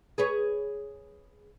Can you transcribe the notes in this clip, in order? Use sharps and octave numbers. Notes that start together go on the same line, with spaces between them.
G#4 B4 C#5